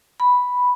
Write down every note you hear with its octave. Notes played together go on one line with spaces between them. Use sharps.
B5